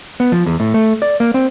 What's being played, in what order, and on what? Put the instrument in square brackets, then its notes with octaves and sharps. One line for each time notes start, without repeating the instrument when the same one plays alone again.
[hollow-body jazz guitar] B3
F3
E2
A2
A3
D5
A#3
C4